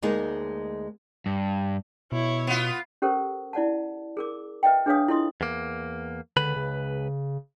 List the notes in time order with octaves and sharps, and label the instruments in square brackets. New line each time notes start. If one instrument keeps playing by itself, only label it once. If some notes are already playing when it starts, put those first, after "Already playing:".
[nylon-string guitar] D2 G#3 A#3 B3 D#4 G#4
[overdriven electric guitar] G2
[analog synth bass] B2 [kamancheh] E4 C#5
[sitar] B3 F4
[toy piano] C#4 G4 A4 A#4 C5
E4 D5 F#5 A5
G#4 A#4 D6
B4 D#5 E5 G5
D4 G#4 B4 C#5 F5 D#6
E4 F4 A4 D#5 C6 D#6
[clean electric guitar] E2 A#3
[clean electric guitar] C#2 B4 B5 [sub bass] D3
[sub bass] C#3